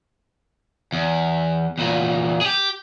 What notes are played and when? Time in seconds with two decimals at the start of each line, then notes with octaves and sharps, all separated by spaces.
0.92 E2
1.78 E2 A#2
2.41 G4 G#4